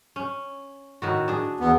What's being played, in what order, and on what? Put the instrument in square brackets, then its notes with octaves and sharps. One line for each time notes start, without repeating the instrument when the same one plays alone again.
[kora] C#4
A2 D#3 F#4
D4 G#4
[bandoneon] E2 B3